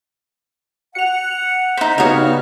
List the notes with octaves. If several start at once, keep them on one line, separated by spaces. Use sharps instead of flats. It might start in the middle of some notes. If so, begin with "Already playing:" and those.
F#5 C#7 F7
D#4 C5 B6
G2 C#3 B3 D#4 F#4 C#5 F6